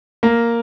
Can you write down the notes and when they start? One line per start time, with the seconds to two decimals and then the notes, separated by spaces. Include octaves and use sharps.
0.23 A#3